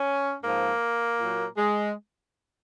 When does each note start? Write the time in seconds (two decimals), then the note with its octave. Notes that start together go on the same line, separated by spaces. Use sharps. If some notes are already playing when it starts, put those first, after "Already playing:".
Already playing: C#4
0.43 G#2 F3 A#3
1.19 A#2 F#3
1.58 G#3